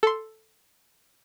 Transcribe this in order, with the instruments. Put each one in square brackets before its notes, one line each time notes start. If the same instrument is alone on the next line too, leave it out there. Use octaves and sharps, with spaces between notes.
[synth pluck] A4 C6